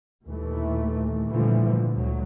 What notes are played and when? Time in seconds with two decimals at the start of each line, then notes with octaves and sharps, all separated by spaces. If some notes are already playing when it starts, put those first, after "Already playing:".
0.25 D#2 A#2 E3 A3
1.29 A#2 D3 E3 F3 G3 A3
1.94 D2 F#3